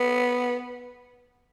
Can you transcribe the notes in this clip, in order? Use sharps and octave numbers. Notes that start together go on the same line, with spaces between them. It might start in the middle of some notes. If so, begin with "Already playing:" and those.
Already playing: B3